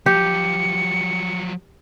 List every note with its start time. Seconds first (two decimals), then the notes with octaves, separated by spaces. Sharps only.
0.06 F3 F#3 G4 C#7